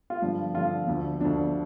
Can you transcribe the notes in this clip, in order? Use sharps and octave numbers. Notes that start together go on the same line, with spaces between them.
F4
G2 D3 F3
G2 D3 F3 F4
D2 D3 F3
D2 D3 F3 D4